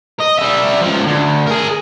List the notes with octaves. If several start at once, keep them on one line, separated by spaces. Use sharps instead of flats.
D#5
G3 E5
C#2 F3
D2
G#4 A#4